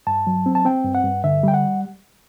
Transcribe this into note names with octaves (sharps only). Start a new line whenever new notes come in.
G2 A5
F#3
C4
A5
C4 G5
G2
F#5
G2
D3 E5
G3 G5
F#5